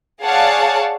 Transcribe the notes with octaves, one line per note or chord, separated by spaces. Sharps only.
G#4 C#5 D5 F5 F#5 A5